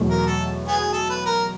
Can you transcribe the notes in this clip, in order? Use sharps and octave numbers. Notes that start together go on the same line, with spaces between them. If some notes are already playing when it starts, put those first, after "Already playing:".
Already playing: E2 B2 F#3 A3
A#4
A4
B3 G#4
A4
B4
A#4